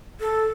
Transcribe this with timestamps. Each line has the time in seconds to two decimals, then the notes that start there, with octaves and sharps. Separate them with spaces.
0.20 A4